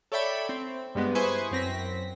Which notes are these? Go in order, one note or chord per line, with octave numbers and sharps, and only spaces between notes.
A4 C#5 D5 E5 G5 B5
C4
G2 G3 G#3 B3
E4 B4 C5 G#5 C#6 D#6
F#2 C4 A#6 B6